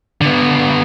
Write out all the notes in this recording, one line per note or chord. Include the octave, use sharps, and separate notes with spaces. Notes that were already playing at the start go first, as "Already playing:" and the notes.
D3 B3